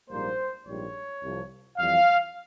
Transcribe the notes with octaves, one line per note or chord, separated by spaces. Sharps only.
A#1 G#2 G3 A#3 C5
A#1 G#2 G3 C#5
C2 C3 F3
F2 E3 G3 F5